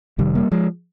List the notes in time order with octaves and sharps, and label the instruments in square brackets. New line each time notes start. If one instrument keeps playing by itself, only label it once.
[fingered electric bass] F1 F2 C3 D#3 G3
G3 A#3
F3 G#3